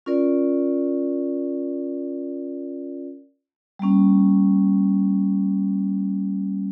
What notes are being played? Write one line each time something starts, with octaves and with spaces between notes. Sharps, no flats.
C#4 F4 A#4 D5
G3 A#3 C#4